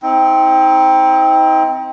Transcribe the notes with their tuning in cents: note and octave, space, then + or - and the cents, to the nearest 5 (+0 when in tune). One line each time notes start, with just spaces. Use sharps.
C4 +0 D#4 +40